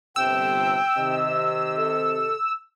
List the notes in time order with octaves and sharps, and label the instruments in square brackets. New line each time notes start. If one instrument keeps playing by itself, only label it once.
[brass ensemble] G1 C3 [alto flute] G5 [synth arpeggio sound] E6
[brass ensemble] C3 D#3 D#5
[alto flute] A4